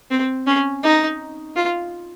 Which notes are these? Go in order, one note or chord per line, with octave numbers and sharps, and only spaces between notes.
C4
C#4
D#4
F4